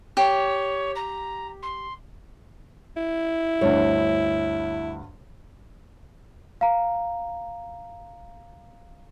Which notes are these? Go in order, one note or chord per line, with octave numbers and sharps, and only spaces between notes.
G4 C#5
A#5
C6
E4
D2 G2 C#5
F5 A#5